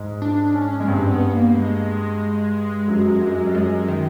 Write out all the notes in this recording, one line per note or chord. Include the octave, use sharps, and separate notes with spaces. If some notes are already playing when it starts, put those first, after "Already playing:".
Already playing: G#2 G#3
D4
C#4
G#3
G2 G3 C4
B3
A#3
G#3
F#2 F#3
F#2 F#3
G3
F#2 F#3 G#3
D#3